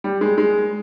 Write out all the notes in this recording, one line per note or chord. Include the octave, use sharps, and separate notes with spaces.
G3
G#3
G#3